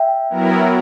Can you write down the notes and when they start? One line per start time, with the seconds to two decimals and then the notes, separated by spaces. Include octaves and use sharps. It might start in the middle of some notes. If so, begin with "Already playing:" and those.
Already playing: E5 G5
0.30 F#3 B3 E4 A#4